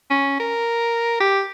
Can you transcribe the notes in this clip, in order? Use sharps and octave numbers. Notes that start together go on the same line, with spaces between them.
C#4
A#4
G4